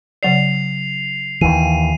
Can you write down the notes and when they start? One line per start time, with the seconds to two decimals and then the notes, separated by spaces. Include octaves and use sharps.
0.23 C#3 F#3 D5 C7 F7
1.41 D#2 E3 D#7